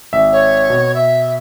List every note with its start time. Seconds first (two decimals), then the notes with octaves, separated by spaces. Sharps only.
0.13 G#1 E5
0.32 C#5
0.70 B2
0.95 E5